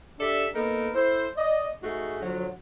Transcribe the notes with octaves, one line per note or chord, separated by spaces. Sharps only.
D4 G4 A4 D5 E5
A#3 B3 D#4 A4 A#4
E4 A4 C5
D5 D#5
G#2 G#3 A3 F#4 G#4
D3 F3 F#3